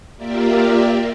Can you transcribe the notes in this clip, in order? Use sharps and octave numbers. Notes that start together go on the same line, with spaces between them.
A#3 F4 G4 A#4 D5 E5